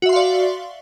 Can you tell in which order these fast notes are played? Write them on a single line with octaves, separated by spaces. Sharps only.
F#4 E5 C6 F5 D5